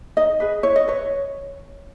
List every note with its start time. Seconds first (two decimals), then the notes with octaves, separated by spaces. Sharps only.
0.17 D#4 D#5
0.40 G#4 B4
0.63 E4 C#5
0.76 D#5
0.88 B4 C#5